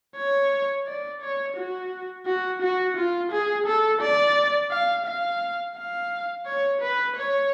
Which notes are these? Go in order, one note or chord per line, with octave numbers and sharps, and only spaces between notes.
C#5
D5
C#5
F#4
F#4
F#4
F4
G#4
A4
D5
F5
F5
F5
C#5
B4
C#5